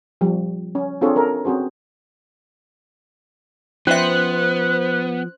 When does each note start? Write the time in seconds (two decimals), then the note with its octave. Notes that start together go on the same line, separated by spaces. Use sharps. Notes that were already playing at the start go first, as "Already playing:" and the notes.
0.21 F3 G3
0.75 C#4
1.01 C4 D4 F4 G#4 A4 C#5
1.16 A4 A#4
1.45 C4 C#4 F#4 G#4 C5
3.87 F3 B3 C#4 C5 E5 F#6